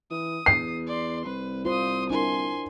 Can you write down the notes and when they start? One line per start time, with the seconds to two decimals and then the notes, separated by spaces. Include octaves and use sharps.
0.11 E3 D#6
0.46 E2 C7
0.87 D5 C6
1.26 C2 B4
1.65 F4 C5 C6 D#6
2.10 D4 E4 A#4 G#5 C6